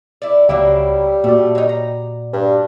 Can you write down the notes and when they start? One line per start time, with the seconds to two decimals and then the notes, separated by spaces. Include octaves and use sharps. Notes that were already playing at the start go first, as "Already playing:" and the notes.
0.22 E4 D5
0.49 C#2 F#3 G3 A#3 E4 D6
1.24 A#2 A3 F#4 D5
1.55 F#3 D#4
1.69 A#5
2.34 G2 D4